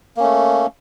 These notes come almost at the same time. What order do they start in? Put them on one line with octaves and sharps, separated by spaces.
A#3 C#4 A3